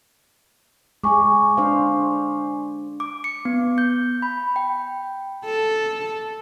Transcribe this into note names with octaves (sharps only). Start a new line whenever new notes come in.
G#3 G#4 G#5 C#6 D6
D4 C5 F5
D6
C#7
B3
G6
B5
G5
A4